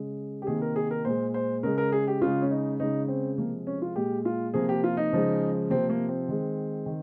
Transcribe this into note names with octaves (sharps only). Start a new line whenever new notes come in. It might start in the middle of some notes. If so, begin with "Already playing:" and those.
Already playing: C#3 G#3
G4
C3 D#3 A#3 G#4
A#4
G#4
A#4
A#2 G#3 C5
C5
C#3 G#3 A#4
A#4
G#4
G4
C#3 G#3 F4
C#4
D#4
C#3 G#3 D#4
C4
C3 F3 G#3 A#3
C#4
F4
A#2 G#3 G4
F4
C3 F3 A#3 G#4
G4
F4
D#4
C#3 F3 G#3
C3 F3 A#3 C4
A#3
C4
D#3 G#3
D#3